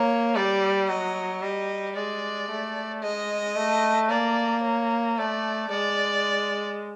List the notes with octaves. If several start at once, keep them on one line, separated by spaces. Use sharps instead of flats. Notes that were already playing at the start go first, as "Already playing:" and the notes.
Already playing: A#3 C#5
G3 D5
F#3 D#5
G3 D#5
G#3 D5
A3
G#3 D#5
A3
A#3 D5
C#5
A3 D5
G#3 D5